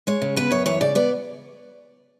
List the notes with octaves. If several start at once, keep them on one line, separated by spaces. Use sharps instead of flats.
G#3 C#5
C#3
B3 B4
F#2 C#5
E3 C#5
C#3 D5
B3 D5